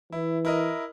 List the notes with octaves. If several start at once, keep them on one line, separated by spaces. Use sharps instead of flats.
E3 E4
E4 A#4 D#5